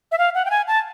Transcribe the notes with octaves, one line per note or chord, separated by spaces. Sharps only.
E5
F5
F#5
G5
G#5
A5